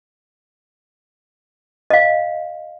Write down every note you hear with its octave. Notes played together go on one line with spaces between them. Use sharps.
D#5 F5